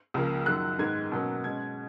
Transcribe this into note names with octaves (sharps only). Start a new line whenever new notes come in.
C#2 C#3 F3 A#3
F#2 D#3 F#3 F#6
G#2 D#3 G#3 B3 G#6
B2 F#3 A#3 C#4
B2 G#3 C#4 G#6